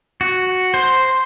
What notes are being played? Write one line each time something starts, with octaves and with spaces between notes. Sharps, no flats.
F#4
C5